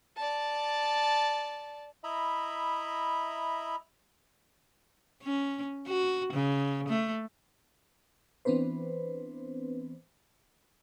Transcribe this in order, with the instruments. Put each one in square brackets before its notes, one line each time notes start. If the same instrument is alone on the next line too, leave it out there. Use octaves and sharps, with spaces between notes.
[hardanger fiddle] D5 A5
[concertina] E4 D#5 E5 A#5 B5
[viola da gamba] C#4
F#4
C#3
A3
[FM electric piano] E3 B3 C4 D4 B4 C5